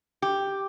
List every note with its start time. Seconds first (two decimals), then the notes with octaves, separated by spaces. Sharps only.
0.22 G4